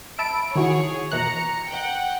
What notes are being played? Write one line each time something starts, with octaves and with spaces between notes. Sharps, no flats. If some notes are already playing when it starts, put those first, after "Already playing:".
E5 A5 B5 D7
D#3 E4 F#4 G#4 C#5
B2 E3 A#5 F#6 C#7
F#5 G5